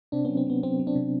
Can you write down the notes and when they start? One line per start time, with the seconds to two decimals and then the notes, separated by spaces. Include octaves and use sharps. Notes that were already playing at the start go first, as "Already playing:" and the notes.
0.12 C3 C4 D4
0.25 F#3 B3 C#4
0.37 C4
0.47 F#3 B3
0.63 F#3 C4
0.79 F#3
0.87 C4 D4
0.95 C3